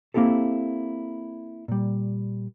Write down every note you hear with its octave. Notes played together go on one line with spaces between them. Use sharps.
A#3 C4 E4 G4 A4
A#2 G3